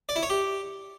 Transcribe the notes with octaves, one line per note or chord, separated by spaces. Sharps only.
D5
E4
C#5
G4